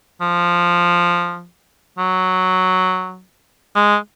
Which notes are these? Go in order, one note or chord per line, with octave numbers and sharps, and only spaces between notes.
F3
F#3
G#3